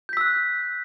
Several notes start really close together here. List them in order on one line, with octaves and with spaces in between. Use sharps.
G6 B6 E6 F#6